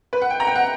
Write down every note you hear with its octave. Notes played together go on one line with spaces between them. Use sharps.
B4
F#5
G5
A#5
G5
F#5